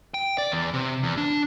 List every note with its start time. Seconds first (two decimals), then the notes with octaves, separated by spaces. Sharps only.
0.14 G5
0.38 D5
0.52 E2
0.74 C3
1.03 E2
1.18 D4